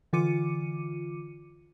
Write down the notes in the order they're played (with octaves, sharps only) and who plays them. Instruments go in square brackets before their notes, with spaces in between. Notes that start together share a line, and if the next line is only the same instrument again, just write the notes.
[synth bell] D3 E3 F4 D6 C#7 D#7